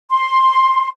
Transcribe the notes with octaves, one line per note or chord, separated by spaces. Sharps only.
C6